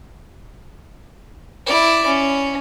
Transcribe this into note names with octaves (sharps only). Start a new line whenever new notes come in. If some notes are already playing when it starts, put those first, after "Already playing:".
E4 D5
C#4